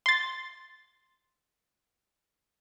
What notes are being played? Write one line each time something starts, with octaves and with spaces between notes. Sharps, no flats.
C6 A6